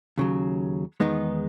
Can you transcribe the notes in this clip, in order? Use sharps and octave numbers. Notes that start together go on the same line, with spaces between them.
D#2 C#3 F#3
E2 D#3 G#3 B3 D#4